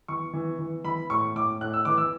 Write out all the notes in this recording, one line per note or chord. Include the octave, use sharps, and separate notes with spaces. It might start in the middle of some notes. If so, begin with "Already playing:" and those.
E3 C#6
E3
E3
E3 B5
A2 C#6
A2 D6
A2 F#6
E6
E3 D6
E6